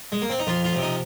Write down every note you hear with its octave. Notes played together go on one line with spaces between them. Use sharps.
G#3
A#3
C4
D#4
F2 F4
F4
C3 F3
D#4